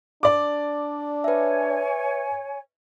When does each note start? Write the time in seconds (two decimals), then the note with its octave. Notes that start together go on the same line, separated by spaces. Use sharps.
0.23 D4 D5 D6
1.24 B4 C#5 E5 G#5